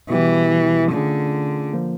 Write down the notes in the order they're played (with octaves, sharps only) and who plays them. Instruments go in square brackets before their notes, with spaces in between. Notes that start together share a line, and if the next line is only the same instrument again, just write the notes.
[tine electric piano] B2 G3 B3 E4 G4 [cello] E3
[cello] D3 [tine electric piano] A3 C#4 F4 G#4
[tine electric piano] F3 A#3